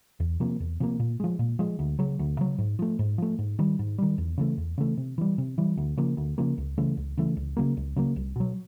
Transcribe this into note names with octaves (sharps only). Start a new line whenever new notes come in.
E2
C3 F3 A#3
E2
C3 F3 A#3
A#2
F3 G#3
A#2
F3 G#3
D2
C#3 F#3
D2
C#3 F#3
G#2
F3 A3
G#2
F3 A3
G#2
D#3 G3
G#2
D#3 G3
E2
C#3 E3 A3
E2
C#3 E3 A3
C3
E3 G3
C3
E3 G3
D2
C#3 F3 A#3
D2
C#3 F3 A#3
C#2
C#3 E3 A3
C#2
C#3 E3 A3
C#2
C#3 F#3 A#3
C#2
C#3 F#3 A#3
C2
B2 F#3